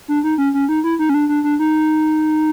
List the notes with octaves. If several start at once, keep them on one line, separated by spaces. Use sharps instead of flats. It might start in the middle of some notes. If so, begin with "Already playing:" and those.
D4
D#4
C#4
C#4
D#4
E4
D#4
C#4
D4
D4
D4
D#4